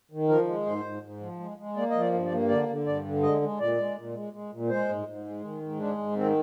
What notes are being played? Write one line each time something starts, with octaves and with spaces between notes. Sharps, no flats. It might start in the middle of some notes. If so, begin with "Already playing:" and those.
D#3
F3 A#4
G#3
G#2 C5
G#2
G#2
F3
G#3
G#3
A#3 D5
F3 D#5
D5
G2
D5
A#3
D3 D5
D3
G2 D5
D3
G#3 D#5
G#3
A#2 D5
G#3
A#2
G#3
G#3
A#2
G#3 C5
G#2
G#2
G#3
D#3
G#2
G#3 D4
G#2
D#3 C4